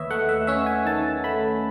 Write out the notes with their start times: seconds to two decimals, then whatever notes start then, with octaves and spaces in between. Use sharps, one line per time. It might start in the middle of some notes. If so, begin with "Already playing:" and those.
Already playing: D#2 D#3 B4 C#5 D#5 E5
0.10 A3 F#5
0.29 E5
0.47 C#4 E5
0.66 G#5
0.85 D#3 A5
1.24 A3 B5